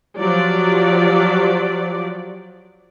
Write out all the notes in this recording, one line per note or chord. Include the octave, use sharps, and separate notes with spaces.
F3 F#3 G4 D5